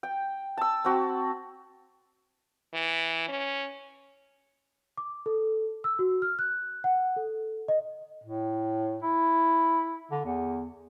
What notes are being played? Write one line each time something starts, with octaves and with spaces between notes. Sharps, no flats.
G5
A5 E6
C4 F#4 A5
E3
C#4
D6
A4
E6
F#4
F6
F#6
F#5
A4
D#5
A2
E4
D3
E2